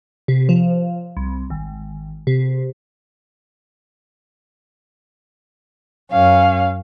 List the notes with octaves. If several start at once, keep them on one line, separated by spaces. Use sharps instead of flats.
C3
F3
C2
G#1
C3
F#2 C#4 F5